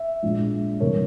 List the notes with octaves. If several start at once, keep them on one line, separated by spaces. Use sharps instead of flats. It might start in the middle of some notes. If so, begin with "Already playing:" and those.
Already playing: E5
A#1 A#2 F3 G#3
C2 C3 E3 A#4 C#5